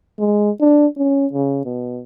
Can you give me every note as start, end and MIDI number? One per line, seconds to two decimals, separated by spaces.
0.19 0.51 56
0.60 0.86 62
0.97 1.27 61
1.33 1.62 49
1.65 2.01 47